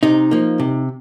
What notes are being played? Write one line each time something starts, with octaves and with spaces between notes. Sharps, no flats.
C3 D#4
F3 A#3
C3